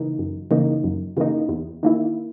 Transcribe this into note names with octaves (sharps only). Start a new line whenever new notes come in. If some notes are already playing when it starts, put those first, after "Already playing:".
Already playing: C#3 E3 A#3 D#4
F#2
C#3 E3 A#3 D#4
F#2
C#3 E3 A#3 D#4
E2
D#3 A#3 E4